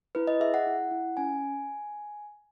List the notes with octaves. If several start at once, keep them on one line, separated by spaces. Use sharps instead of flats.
E4 B4
D#5
G#4 E5
F#5
E4
E4
C#4 G#5